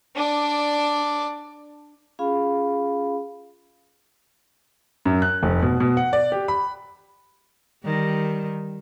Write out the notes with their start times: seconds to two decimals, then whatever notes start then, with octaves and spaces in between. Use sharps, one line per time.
0.16 D4 D5
2.19 C#4 F4 G#4 F5 B5
5.05 F#2
5.22 F#6
5.43 F1
5.62 B2
5.80 B2
5.97 F#5
6.13 D5
6.32 G4
6.48 B5
7.84 D#3 G3